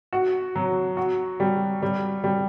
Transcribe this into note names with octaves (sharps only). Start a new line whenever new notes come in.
F#4
F#3
F#4
G3
G3
G3